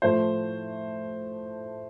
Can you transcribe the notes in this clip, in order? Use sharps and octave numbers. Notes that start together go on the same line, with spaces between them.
A2 F3 A3 C5